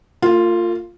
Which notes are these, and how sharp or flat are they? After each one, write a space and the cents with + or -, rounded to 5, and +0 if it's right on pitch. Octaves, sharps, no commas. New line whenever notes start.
A#3 -45 F4 +0